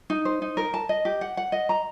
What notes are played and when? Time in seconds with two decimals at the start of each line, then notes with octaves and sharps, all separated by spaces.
0.10 D#4
0.25 C5
0.42 D#4
0.57 A#4
0.74 A5
0.89 D#5
1.05 G4
1.21 F#5
1.37 F#5
1.52 D#5
1.69 A#5